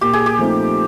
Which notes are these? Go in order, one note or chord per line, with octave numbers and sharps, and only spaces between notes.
A#2 G4
G#4
G4
F3 A3 C4 D#4